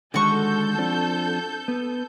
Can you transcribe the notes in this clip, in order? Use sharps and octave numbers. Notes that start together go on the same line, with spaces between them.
D3 D#3 G#3 F#4 A4 C#6 G6
F3 C4 D4
B3